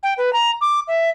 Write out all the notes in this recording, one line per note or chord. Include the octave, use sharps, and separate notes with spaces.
G5
B4
A#5
D6
E5